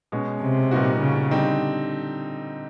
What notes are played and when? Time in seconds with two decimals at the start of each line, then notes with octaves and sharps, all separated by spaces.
0.12 B2 G#3 C#4
0.41 C3
0.71 A#2 G3 B3 D#4 F#4
1.02 C#3
1.31 D3 G3 C4 D#4